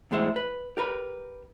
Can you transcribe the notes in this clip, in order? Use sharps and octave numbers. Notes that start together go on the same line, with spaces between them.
E2 A2 G#3 C5 E5
B4
G4 A#4 B4 B5